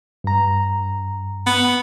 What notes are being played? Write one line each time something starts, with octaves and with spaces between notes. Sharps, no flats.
G2 A#5
B3